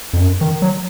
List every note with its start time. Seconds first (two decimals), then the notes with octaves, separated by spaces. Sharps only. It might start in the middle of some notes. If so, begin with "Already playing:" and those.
0.13 F2
0.20 F#2
0.41 D#3
0.62 F#3